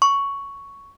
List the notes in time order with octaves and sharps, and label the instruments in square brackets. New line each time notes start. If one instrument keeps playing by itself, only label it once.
[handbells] C#6